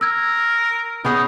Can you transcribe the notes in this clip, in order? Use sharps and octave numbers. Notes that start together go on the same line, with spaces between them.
A#4 E6 G#6
B3 C#4 D#4 G#4